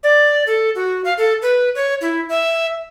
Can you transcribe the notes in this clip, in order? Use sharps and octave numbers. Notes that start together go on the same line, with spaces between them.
D5
A4
F#4
F5
A4
B4
C#5
E4
E5